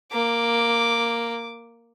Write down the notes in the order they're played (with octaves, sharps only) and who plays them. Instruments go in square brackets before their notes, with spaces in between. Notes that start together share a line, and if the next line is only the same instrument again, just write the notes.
[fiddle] A#3 [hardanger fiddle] D6